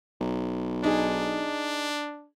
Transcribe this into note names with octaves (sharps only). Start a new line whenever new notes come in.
B1
D4 D#4 G#4